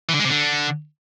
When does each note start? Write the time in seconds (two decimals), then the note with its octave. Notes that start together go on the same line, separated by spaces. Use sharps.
0.09 E3
0.14 D3
0.19 G#3
0.25 C3
0.30 D3